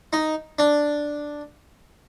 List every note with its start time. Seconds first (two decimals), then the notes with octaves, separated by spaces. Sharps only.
0.13 D#4
0.59 D4